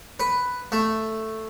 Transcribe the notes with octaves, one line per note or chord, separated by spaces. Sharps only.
B4
A3